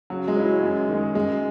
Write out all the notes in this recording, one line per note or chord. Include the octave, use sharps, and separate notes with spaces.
C#3 F#3
G#3
F#3 C#4 E4
F#2
D#3 G#3
F#2 G#3